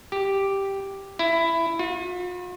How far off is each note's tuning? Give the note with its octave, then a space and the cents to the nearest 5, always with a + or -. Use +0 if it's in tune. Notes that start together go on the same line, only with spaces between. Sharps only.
G4 +0
E4 +10
F4 +45